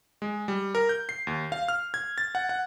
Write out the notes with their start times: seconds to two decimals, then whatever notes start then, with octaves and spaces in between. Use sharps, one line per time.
0.22 G#3
0.48 G3
0.75 A#4
0.89 G6
1.09 C7
1.27 D#2
1.52 F5
1.68 F6
1.94 G#6
2.18 A6
2.35 F#5
2.49 F#5